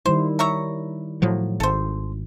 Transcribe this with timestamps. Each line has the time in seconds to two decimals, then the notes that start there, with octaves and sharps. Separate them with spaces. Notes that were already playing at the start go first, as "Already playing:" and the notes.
0.06 D#3 G3 E4 C5
0.39 C#5 E5 A#5
1.22 A2 F3 F#3
1.60 G#1 A4 C5